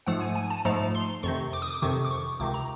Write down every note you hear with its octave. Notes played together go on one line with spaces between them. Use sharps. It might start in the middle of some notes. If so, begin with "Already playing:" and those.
G#2 F3 A3 F#5
G#5
G#5
A5
G#2 F3 A3 A#5
C6
F2 C3 D#3 C#6
D6
D#6
D6
F2 C3 D#3 C#6
D6
C#6
C#2 C3 D#3 D6
A#5